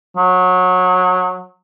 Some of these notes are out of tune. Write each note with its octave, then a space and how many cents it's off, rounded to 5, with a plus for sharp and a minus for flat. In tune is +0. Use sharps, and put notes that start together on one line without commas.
F#3 -20